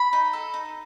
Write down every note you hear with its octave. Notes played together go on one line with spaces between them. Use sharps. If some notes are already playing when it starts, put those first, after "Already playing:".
Already playing: B5
D#4
A4
D#4